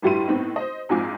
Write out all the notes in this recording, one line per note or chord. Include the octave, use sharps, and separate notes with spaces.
G1 A2 G3 E4 C6 D#7
A2 B3 C4 D#4
C5 D#5
A#1 G#2 C4 F4 G#5 D6